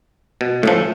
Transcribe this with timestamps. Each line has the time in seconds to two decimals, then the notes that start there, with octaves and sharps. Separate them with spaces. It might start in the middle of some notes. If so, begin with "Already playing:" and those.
0.41 B2
0.63 A2 F3 A3 C#4 A4